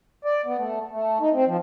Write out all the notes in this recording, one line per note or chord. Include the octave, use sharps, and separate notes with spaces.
D5
B3
A3
A3
D#4
C4
F3